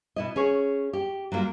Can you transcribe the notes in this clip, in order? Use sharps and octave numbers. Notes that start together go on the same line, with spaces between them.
B2 E4 D#5
C#4 G#4 C#5
G4
F#3 G3 A#3 F4